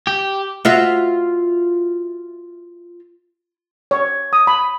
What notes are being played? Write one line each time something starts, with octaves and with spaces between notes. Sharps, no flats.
G4
F4 F#4 E5
C#5
D#6
B5